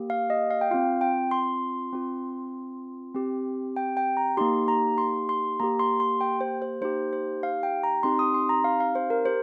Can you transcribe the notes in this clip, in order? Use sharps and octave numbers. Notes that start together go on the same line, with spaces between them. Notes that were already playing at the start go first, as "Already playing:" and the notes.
Already playing: A#3 G4
F5
D#5
F5
G5
C4 F4 F5
G5
C6
C4 F4
C4 G4
G5
G5
A#5
A#3 D#4 G4 C6
A#5
C6
C6
A#3 G4 A#5
C6
C6
G5
C5
C5
A#3 D#4 G4 C5
C5
F5
G5
A#5
C4 D#4 G4 C6
D#6
C6
A#5
F5
F5
C5
A#4
G4 C5